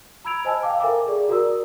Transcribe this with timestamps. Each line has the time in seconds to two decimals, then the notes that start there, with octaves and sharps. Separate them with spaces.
0.25 A#5 B5 E6 G#6 D7 F7
0.45 C5 D#5 G#5 A5 E6
0.63 F5 G5 D6
0.80 A4 A#4 E5 G#5 A#5 D6
1.07 G#4 D5
1.28 F#4 A#4 D5 A#5 D#6 E6